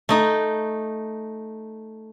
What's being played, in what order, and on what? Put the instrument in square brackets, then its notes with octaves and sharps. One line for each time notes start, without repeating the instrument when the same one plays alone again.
[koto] A3 D#4